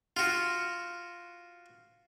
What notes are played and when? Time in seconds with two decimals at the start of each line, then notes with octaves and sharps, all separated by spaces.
0.17 F4 F#4